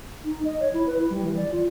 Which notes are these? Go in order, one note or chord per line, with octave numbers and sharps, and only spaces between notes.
D#4
D#5
C#5
E4
B4
E4
G3
E3
D5
F4